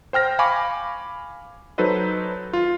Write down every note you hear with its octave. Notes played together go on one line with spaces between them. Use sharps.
C5 G5 F6 A#6
F5 G#5 B5 C#6 D6
F#3 D#4 A4 B4 C5 D#5
F4